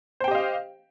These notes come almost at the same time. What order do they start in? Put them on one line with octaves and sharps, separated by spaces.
C5 G5 G4 D#5 F5